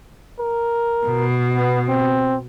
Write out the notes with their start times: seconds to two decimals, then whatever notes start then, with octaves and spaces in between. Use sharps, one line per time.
0.39 A#4
1.06 B2
1.56 B3
1.88 C4